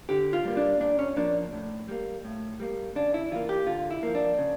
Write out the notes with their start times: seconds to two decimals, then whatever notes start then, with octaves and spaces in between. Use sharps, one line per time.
0.09 D3 G4
0.33 F4
0.45 G3 A#3
0.57 D4
0.80 A#2 D4
0.99 C#4
1.16 F3 A#3 D4
1.52 A2
1.88 G3 A#3
2.25 A2
2.60 G3 A#3
2.95 C#3 D4
3.14 E4
3.32 E3 A#3 F4
3.49 G4
3.67 D3 F4
3.91 E4
4.03 F3 A#3
4.15 D4
4.38 C#3